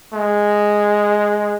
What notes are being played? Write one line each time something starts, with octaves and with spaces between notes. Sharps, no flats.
G#3